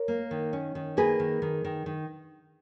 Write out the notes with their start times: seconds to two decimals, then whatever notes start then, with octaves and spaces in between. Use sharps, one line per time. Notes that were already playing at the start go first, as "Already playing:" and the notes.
Already playing: A#4 C#5
0.08 A#3
0.31 D#3
0.53 C#4
0.75 D#3
0.97 A#3 G#4 B4
1.20 D#3
1.42 D#3
1.64 D#3
1.86 D#3